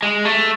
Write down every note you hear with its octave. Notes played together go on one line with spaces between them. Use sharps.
G#3
A3